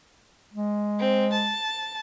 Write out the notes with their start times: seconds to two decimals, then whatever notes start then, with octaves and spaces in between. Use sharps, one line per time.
0.53 G#3
0.99 C4
1.32 A5